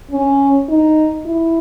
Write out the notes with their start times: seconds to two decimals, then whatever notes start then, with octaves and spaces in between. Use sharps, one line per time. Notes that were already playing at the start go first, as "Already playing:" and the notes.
0.11 C#4
0.69 D#4
1.25 E4